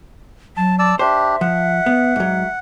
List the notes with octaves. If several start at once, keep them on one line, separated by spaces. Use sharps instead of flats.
F#3 A5
D5 A5 E6
D4 G4 C5 E5
F3 F#5
B3
G#2 F#3